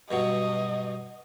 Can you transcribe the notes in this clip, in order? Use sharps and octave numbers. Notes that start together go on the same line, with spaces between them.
G2 B2 F#3 D#5